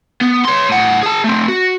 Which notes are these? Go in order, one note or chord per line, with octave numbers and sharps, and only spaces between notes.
B3
C#5 C6
A2 F#5
G#4 A5
A3 C4
F#4